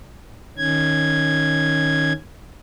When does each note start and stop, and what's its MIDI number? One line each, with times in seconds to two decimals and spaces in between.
0.57 2.13 51
0.57 2.13 61
0.57 2.13 92